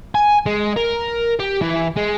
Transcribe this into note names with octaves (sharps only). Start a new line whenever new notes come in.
G#5
G#3
A#4
G4
E3
G#3